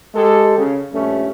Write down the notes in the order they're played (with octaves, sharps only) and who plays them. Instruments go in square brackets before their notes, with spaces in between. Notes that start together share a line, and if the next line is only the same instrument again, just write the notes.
[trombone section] G#3 G4 A4
C#3
A#1 G2 A3 C#4